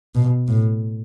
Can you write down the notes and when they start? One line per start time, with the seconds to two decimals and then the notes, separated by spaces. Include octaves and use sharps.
0.15 B2
0.48 A2